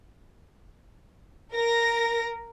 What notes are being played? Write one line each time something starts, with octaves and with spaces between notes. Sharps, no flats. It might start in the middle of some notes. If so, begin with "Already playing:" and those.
A#4 A#6